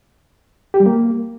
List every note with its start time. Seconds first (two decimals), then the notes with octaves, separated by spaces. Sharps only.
0.74 G4
0.80 G3
0.86 A#3